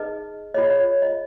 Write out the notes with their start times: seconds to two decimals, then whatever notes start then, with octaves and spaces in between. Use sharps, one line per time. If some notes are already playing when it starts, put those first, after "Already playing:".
Already playing: D#4 G#4 B4 D#5
0.54 F4 G#4 C#5 D#5
0.70 C#5
1.02 D#5